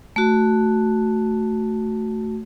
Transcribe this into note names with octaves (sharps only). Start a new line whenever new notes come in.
A3 F#4